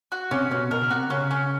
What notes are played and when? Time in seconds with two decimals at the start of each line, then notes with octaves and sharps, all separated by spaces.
0.12 F#4
0.31 C3 C#4
0.51 B2 C#4
0.71 B2 A#4
0.81 C#3
0.90 C3 F#4
1.10 C#3 C#4
1.31 C#4